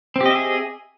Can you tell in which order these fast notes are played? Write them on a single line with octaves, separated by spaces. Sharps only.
C4 G4 D#5 E5 G#4